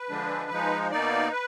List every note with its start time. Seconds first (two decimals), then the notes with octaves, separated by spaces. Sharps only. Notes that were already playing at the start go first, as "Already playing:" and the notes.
Already playing: B4
0.10 D3 F3 G#3 D4
0.51 F3 G#3 D#4
0.91 B2 A#3 D#4 D5
1.32 B4